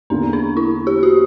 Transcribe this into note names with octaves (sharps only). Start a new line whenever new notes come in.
E2 D3 A#3 C#4
D4
E4
G4
F#4